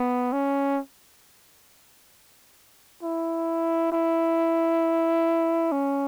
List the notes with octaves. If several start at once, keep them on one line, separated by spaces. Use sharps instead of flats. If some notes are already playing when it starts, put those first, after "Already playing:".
Already playing: B3
C#4
E4
E4
C#4